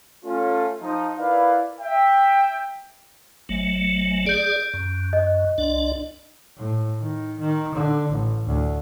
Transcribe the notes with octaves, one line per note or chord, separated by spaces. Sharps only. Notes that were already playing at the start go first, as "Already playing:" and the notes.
A3 C#4 F4
F3 D#4
E4 A#4 B4 D5 F5
E5 G5
G#1 F#3 A3
G#4 D5 G6 D7
F#2
D#5
C2 D4 D5
A2
D#3
D#3
D3
A1
D2